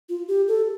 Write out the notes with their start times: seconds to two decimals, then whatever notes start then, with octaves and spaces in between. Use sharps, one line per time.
0.09 F4
0.28 G4
0.48 A4